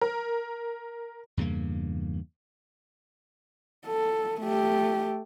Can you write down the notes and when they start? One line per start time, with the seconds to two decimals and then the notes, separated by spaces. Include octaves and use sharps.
0.01 A#4
1.37 E2 G2 C#3 A#3
3.87 A4
4.41 A3 G4